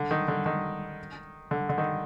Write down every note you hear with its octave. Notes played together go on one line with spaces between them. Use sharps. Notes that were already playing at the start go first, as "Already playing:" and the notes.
Already playing: D3
D#3
D3
D#3
D3
D3
D#3